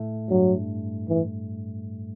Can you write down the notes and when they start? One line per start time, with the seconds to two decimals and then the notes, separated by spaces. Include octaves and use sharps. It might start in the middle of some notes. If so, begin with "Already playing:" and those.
Already playing: A2 A3
0.29 G2 F#3 G3
1.09 E3